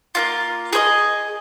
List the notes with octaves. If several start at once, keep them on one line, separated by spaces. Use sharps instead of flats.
A#3 C#4 F4
G#4 C5 D#5